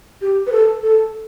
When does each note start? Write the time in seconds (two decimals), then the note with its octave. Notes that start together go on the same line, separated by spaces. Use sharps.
0.21 G4
0.47 B4
0.52 A4
0.83 A4